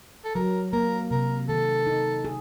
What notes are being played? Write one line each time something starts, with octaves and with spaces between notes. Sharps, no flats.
A4
F#3 A#4
A#3 A#4
C3 A#4
D#3 A4
D#4
G#4